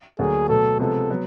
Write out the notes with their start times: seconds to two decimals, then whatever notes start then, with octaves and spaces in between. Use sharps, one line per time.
0.19 D2 D3 F#3 A#3 G#4
0.49 B2 F#3 A3 A4
0.79 C3 F3 G#3 B3 A4
1.10 F#3 B3